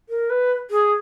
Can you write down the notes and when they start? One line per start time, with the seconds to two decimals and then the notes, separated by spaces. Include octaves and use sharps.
0.09 A#4
0.30 B4
0.71 G#4